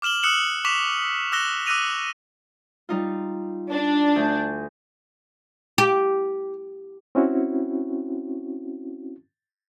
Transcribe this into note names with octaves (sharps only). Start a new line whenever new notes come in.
D6 F6 E7 F#7 G7
D#6 E6 F#6 C#7 E7 F#7
C#6 D6 B6 E7 F7
D6 E6 F#6 A#6 E7 G7
D6 E6 F#6 A#6 D#7 F7
G3 D#4 F4
D4
D2 G#5 G6
G4
C4 C#4 E4 F#4